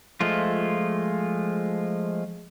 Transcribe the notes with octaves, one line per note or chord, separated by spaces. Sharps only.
F3 G#3 A3 F4